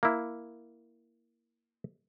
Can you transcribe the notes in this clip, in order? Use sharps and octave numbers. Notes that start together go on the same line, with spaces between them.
A#3 E4